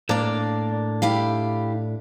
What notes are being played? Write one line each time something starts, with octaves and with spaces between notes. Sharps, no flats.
A2 A#3 D4 D5
E4 G4 F5